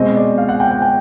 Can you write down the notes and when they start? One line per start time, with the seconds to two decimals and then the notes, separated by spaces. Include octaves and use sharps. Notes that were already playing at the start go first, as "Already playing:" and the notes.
Already playing: B2 G#3 C4 D#5
0.16 D5
0.38 F5
0.49 F#5
0.60 G5
0.71 G5
0.82 G5